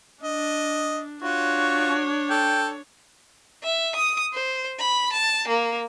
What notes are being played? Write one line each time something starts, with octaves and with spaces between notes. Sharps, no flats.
D4 D#5
D4 F4 F#4 C#5
A4 G5
E5
D#6
C5
B5
A5
A#3